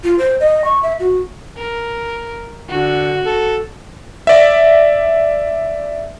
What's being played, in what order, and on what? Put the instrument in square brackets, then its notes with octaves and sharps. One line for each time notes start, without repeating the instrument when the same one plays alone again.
[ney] F4
C5
D#5
C#6
E5
F#4
[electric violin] A#4
[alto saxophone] D3 [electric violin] F#4
[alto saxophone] A4
[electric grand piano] D5 E5